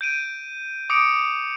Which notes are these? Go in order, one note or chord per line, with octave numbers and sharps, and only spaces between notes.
G6 D7 D#7
D6 D#6 C#7 D7